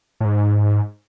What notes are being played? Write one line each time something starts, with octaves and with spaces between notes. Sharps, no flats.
A2
G#2